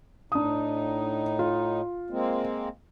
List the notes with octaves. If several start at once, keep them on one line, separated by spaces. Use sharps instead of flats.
A2 D4 D#4 D#6
F4
G#3 A#3 C4